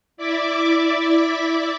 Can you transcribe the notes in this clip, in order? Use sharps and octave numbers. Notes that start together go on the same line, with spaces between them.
E4 D5 E5 D6